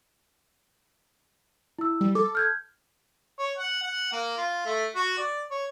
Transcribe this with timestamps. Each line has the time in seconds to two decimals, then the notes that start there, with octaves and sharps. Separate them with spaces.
1.79 E4 E6
2.01 G3
2.15 A4 D6
2.35 F6 G6 G#6
3.39 C#5
3.58 F#5
3.83 F#5
4.12 A#3
4.38 F4
4.66 A3
4.96 F#4
5.18 D5
5.51 C#5